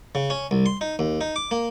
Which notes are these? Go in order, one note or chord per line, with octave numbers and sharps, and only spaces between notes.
C#3
C#4
C2
C6
D#4
D#2
D#4
D6
A#3